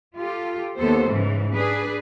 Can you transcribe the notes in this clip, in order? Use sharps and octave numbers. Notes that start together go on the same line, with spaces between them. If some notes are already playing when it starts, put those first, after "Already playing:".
F4 G4 A4
D#2 B3 A4 C5
G#2 C#3 E3
D4 G#4 B4